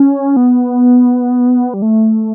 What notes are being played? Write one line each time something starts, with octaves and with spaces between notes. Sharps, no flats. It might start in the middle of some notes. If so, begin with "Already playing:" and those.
Already playing: C#4
B3
G3
A3